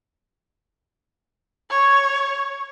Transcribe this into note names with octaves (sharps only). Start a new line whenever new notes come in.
C#5